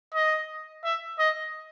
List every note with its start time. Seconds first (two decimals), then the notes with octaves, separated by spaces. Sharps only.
0.14 D#5
0.84 E5
1.19 D#5